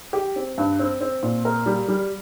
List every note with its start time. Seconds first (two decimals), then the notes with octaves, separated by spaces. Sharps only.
0.13 G4
0.36 C4
0.58 G2
0.79 C4
1.01 C4
1.23 A#2
1.45 A#4
1.66 G3
1.88 G3